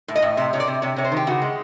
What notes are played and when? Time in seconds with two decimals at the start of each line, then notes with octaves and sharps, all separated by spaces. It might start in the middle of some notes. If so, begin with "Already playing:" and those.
0.08 A2
0.15 D#5
0.22 A2
0.37 C3 E5
0.53 C3 C#5
0.60 D5
0.68 C3
0.82 C3 C#5
0.96 C3 C#5
1.04 C5
1.12 D#3 G4
1.27 C#3 F#4
1.42 G#3